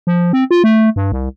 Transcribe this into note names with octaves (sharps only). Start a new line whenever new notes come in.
F3
C4
F4
A3
G2
C2